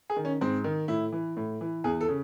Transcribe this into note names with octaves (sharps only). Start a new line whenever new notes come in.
G#4
D#3
C#4
G#2 C4
D#3
A2 E4
E3
A2
E3
E2 G#4
A4
C#3